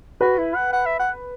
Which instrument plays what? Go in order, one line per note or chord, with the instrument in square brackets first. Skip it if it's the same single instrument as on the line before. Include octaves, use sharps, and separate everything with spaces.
[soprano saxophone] F#4 [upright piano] B4
[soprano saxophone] E4
F#5
F#5
E5
F#5